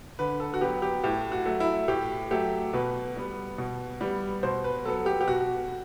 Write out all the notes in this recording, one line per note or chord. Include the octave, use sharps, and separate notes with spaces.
D3 B4
A4
F#4
F#3 B3 G4
G4
A2 G4
F#4
F#3 A3
E4
A2 G4
F#3 A3 G4
B2 B4
G3 B3
B2
G3 B3
B2 C5
B4
F#3 B3 A4
G4
G4
B2 F#4